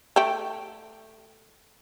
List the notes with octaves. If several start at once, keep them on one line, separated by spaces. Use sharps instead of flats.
A3 G4